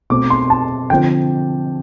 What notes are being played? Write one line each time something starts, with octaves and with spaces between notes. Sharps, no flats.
B2 A3 C4 D6
C6
A5
D3 F3 C4 G5